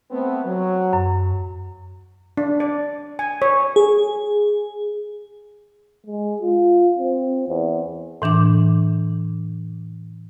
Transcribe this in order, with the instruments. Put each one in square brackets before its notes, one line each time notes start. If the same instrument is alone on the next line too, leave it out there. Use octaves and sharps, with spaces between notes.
[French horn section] A3 B3 C4
F#3
[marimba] F#2
[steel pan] D4
D5
G#5
C#5
[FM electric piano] G#4
[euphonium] G#3
F4
C4
E2
[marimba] A2 E3 D4 D6